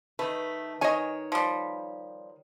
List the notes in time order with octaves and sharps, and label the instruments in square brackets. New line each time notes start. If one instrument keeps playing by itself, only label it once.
[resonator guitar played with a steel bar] D#3 B4 [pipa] A3
[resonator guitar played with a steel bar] D#3 C#5 [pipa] D#5 G#5
[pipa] F3 G3